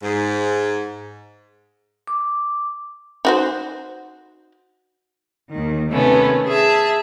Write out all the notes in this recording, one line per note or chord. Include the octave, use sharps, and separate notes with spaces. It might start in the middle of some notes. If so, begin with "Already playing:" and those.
G#2
D6
D#4 F#4 C5
D#2 D#3
C3 D#3 A3 B3 C#4
G#4 E5 A5